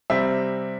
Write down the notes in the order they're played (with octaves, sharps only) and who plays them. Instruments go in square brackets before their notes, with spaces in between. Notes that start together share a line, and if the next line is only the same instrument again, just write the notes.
[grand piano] C3 G3 C4 E5